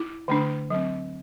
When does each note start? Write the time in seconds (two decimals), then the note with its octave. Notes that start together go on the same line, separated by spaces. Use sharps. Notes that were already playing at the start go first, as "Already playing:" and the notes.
Already playing: E4
0.28 D3 A3 D4
0.70 F#3 C4